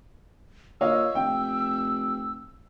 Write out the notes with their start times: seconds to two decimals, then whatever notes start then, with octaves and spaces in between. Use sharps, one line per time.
0.81 A#2 C#5 D#5 F5 E6
1.15 F1 G5